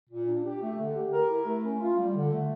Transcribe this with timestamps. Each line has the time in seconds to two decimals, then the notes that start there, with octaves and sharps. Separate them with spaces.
0.08 A#2
0.26 D4
0.44 G4
0.60 A3
0.78 D3
0.95 G4
1.11 A#4
1.29 E4
1.45 A3
1.63 C#4
1.80 F4
1.97 G3
2.14 D3
2.31 A3